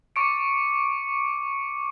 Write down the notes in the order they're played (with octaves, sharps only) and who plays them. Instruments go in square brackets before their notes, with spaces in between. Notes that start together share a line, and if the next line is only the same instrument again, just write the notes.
[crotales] C#6 D6 C#7 D7